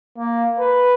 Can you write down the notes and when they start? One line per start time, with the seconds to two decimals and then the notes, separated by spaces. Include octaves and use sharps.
0.18 A#3
0.60 B4